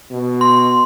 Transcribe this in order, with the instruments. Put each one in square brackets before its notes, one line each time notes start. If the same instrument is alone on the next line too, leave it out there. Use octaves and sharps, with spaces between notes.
[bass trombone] B2
[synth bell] C6